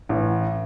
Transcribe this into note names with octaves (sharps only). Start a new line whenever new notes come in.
A1